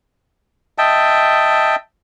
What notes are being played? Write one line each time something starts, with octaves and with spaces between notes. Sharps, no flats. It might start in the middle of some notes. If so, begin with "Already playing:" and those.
D#5 E5 G5 A5